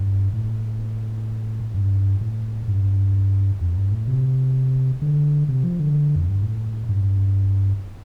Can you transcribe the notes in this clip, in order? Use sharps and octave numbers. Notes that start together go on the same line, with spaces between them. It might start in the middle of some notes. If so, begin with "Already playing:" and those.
Already playing: G2
A2
G2
A2
G2
F2
G2
A2
C3
D3
C3
F3
D3
F2
G2
A2
G2